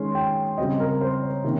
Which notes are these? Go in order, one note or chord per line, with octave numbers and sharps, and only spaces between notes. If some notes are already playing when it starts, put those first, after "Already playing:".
Already playing: D#3 G#3 C#4 C6
G5
C#3 G3 C4 D#5
A#4
C5
C#5
C3 D#3 A#3 C#4